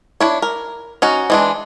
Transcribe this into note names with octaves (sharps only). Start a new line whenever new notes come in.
D4 E4 C#5
A#4
C#4 D#4 F#4
E3 G#3 D4